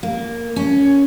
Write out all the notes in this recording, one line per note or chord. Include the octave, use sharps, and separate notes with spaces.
A#3
C#4